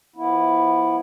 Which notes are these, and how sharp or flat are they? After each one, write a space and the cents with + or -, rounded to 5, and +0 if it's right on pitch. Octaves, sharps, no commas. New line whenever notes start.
F3 +0 B3 -20 E4 +0